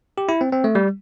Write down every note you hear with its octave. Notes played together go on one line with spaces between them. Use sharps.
G4
E4
C4
C4
A3
G3